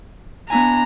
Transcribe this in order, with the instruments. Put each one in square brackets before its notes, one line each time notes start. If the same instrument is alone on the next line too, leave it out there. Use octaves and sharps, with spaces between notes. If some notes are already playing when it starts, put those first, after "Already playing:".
[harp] B3 E4 G#5 [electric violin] D4 A#5